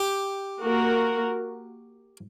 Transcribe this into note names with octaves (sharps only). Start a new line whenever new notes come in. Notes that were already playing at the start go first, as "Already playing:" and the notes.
Already playing: G4
A#3 F#4 A#4